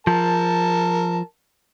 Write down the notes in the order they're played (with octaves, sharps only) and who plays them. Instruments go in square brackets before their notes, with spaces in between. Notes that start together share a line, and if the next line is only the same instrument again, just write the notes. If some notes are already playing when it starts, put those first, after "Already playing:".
[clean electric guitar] F3 [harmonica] A#4 A5